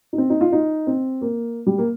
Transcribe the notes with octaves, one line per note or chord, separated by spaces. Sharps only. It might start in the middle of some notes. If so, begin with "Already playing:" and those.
D#4
C4
D#4
F4
D#4
C4
A#3
G3
A#3